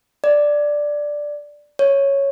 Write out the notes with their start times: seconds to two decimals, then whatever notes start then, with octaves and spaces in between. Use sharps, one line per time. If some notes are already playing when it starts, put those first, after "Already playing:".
0.24 D5
1.79 C#5